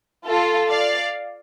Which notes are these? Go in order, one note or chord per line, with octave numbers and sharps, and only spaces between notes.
F4 A4
D5 F5